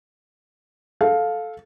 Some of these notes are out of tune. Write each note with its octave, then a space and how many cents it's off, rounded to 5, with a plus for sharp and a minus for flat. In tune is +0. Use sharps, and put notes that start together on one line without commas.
A4 -10 F5 +10